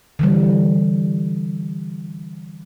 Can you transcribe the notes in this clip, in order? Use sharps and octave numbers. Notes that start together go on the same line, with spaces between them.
D3 E3 G3